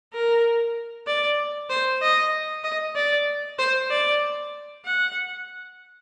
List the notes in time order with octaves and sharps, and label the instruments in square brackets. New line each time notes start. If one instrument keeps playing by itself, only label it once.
[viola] A#4
D5
C5
D#5
D#5
D5
C5
D5
F#5